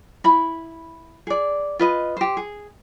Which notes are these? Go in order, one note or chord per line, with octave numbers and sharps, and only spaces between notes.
E4 B5
G#4 D5
F4 B4 D#5
G4 C5
G#4